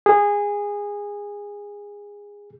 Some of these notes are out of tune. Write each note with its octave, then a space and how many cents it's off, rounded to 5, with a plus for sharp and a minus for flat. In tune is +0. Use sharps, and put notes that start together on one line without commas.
G#4 -20